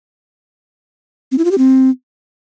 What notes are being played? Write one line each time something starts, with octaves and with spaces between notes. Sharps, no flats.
C4
E4
F4
G4
C4